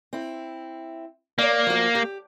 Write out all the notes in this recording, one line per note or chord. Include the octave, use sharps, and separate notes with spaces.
C4 E4
A#3 C#5 D5
F3 F#4
G4